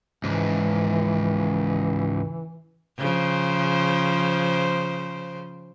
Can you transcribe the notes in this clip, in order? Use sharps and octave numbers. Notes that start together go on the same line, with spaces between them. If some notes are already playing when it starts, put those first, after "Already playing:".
C#2 G#2 E3
C#3 F3 C5